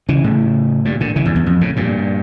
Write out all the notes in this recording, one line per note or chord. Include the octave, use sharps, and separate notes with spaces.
C#3 E3
A2 C#3
G2 A#2
A#2 D3
C#3 E3
E2 G2
E2
F2
A2 C#3
G2 A#2